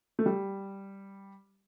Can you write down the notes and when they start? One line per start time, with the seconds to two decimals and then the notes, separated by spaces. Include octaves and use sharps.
0.19 A3
0.26 G3